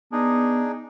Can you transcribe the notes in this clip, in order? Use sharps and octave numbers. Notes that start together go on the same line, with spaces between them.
B3 D4 D#4 G#4